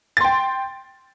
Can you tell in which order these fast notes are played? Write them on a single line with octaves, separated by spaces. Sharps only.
A6 C6 G5